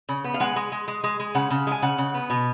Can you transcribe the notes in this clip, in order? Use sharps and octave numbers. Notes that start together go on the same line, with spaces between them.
C#3
B3
F5
G#3 F#5
G#3
G#3
G#3
G#3
G#3
C#3 F#5
C#3
G#3 G#5
C#3 F#5
C#3
B3
B2